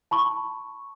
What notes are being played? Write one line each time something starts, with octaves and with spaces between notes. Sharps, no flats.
A5 B5 C#6